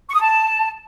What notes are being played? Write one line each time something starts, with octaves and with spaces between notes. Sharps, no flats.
C#6
D#6
A5